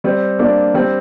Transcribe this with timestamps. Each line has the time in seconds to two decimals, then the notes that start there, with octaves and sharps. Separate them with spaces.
0.04 G3 C4
0.39 A#3 D4
0.74 G3 C4